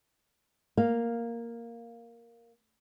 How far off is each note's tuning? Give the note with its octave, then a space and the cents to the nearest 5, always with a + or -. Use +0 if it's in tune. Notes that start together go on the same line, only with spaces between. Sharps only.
A#3 +0 F5 +0